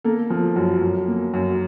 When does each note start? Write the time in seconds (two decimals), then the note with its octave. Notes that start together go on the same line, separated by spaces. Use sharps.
0.04 A#3 A4
0.30 F3
0.56 F#2
0.82 F#2
1.08 A#3
1.34 F#2